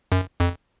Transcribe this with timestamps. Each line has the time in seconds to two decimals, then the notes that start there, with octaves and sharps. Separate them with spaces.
0.12 F#2
0.40 F2